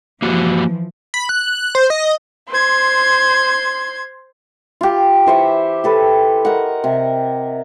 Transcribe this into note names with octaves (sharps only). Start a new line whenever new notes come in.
E3 F3 A#3 F#4 G4
B5
F#6
C5
D#5
C5 C6 G#6
F4 G4
E3 C5 E5 C#6
G4 A4 B4
A#4 D#5 F#5
C3